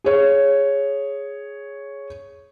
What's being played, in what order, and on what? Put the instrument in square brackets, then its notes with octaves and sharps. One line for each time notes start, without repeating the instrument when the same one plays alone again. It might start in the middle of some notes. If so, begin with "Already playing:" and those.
[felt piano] G#4 C#5